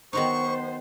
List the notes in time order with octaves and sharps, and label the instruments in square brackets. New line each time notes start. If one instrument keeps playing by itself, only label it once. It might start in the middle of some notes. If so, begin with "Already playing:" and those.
[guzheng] D#3 F#3 D#4 [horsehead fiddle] B3 [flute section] C5 [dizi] C#6